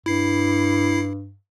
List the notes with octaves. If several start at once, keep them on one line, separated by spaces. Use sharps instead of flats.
G2 E4 C7